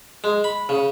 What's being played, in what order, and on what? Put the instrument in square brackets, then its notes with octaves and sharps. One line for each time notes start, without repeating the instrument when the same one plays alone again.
[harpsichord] G#3
B5
C#3